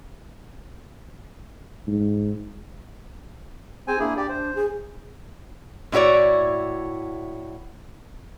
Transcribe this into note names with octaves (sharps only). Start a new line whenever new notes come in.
G#2
C4 G#4 C5 G#5
A#3 D4 E4 G#4
G4 D5
C5
G#4
A2 E4 F#4 C#5 D5